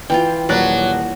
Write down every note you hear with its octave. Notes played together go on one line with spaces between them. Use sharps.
E3 E4 F4 G5
D#1 F#3 D5 F#6